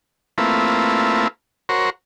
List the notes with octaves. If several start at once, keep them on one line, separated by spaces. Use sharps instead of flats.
A3 A#3 C4 E4 F4 B4
F#4 A#4 C5 C#5